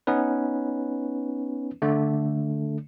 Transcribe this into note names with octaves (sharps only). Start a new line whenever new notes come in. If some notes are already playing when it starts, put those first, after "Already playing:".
B3 C#4 D#4 B4
D3 A3